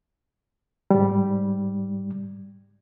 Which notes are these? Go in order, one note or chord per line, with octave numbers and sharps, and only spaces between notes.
G#2 G3